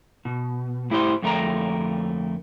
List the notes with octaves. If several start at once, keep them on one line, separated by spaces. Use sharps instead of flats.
B2
A2 E4 G4 C5
F2 D3 A3 A#4 G5 A#5